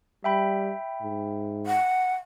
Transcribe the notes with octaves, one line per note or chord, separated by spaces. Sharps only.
G3 E5 G5 B5
G#2
F#5